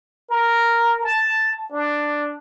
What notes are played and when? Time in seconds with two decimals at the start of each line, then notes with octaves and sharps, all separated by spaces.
0.30 A#4
1.03 A5
1.72 D4